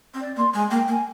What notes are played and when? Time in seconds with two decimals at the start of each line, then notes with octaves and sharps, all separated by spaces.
0.14 C4
0.20 D5
0.37 A#3 C6
0.54 G#3 G#5
0.67 G#5
0.71 A#3 G5
0.88 A#3 G#5